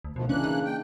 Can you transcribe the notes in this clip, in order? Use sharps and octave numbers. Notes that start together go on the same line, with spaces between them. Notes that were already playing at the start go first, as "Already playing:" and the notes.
D2
D2 B2 D#3 F3
C#3 E3 A#3 C#4 D4 F#6
D#4
G5